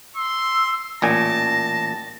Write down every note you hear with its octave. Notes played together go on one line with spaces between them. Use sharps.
C6 E6
A1 A#2 G#5 A5 A#6